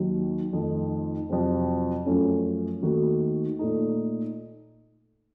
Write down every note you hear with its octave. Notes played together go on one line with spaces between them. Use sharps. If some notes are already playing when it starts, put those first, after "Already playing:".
Already playing: D#2 D#3 F#3
F2 D#3 A3 D#4
F2 C3 F#3 C4
F#2 F3 A3 C#4
D#2 D#3 A3 D#4 F#4
A#2 A3 D#4